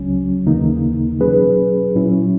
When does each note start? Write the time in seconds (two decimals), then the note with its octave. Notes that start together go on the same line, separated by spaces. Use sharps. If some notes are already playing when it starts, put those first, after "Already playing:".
Already playing: C#2 C#3 F#3 C#4
0.46 D#2 C#3 E3 A#3 D#4
1.21 B2 F#3 C#4 G#4 B4
1.95 A#2 F#3 C#4 E4